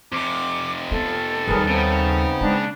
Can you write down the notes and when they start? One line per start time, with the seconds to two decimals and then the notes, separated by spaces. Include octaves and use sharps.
0.12 F2 C3 D6
0.91 A#3 B3 A4
1.48 D#2 G3 G#4 A#4 B4
1.67 C#3 B3 C4 D#4
2.41 G#3 A#3 D4